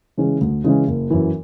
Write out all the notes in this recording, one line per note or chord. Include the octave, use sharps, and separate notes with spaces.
C#3 E3 G#3 C#4
D2
C#3 E3 G#3 C#4
F#1
F#2 E3